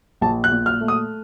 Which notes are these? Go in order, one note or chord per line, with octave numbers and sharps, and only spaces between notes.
A#1 A5
F#6
A#2
F6
A3
D#6